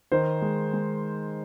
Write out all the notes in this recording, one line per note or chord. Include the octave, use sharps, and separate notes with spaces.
D#3 C5
G#3
G#3